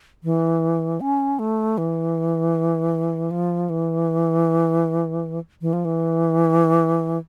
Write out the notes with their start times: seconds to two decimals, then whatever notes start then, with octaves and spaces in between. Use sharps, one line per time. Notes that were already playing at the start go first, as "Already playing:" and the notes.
0.24 E3
1.01 C#4
1.39 A3
1.78 E3
3.31 F3
3.70 E3
5.61 E3
5.73 F3
5.85 E3